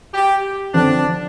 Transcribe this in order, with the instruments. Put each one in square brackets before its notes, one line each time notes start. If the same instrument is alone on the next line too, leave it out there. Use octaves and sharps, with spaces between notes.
[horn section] G4
[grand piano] D3 F3 C4 [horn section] D4